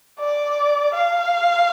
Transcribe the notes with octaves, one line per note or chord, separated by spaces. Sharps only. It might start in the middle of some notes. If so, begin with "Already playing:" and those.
D5
F5